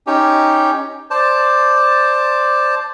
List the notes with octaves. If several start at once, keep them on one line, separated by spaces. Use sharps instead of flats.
C#4 D#4 G4
C5 D5 A5